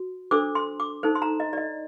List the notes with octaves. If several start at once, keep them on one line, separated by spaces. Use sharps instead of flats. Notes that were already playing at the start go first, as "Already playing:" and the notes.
Already playing: F#4
D4 A4 C5 D6
C6
D6
D#4 A4 C5
C6
A#5
D#5
D5
D#5